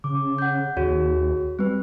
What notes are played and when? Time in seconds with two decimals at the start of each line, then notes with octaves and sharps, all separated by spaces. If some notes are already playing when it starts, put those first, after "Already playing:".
0.04 C#3 D6
0.38 F#5 G6
0.77 D#2 F#4 G#4 C#5
1.59 G3 C4 B4